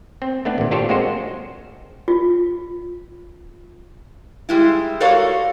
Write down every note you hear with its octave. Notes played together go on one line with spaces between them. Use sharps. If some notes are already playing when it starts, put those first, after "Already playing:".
C4
A3 B3 D4
G#1 A#2
D4 F4 G4 A4 C5 C#5
G#3 A#3 C4 F#4 C5
F4
G3 G#3 E4
F#4 A4 A#4 C#5 D5 F5